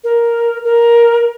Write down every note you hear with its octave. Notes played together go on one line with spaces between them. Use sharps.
A#4
A#4